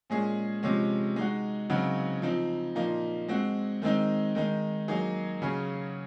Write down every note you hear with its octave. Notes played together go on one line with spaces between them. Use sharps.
A#2 G#3 C#4 G#4
C3 F3 G#3 C#4
G#3 D#4 F#4
C#3 F#3 C4 D#4 F#4
F3 C4 D#4
A#2 F3 A#3 D#4
G#3 C4 F#4
D#3 G#3 C4 D#4
D#3 G#3 D#4
F#3 A#3 D#4 G#4
C#3 F#3 C#4 G#4